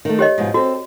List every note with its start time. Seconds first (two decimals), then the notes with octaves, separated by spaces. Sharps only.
0.05 D#3 A3
0.19 G4 C#5 D#5
0.38 G#2 B2 F3
0.54 C4 F#4 A4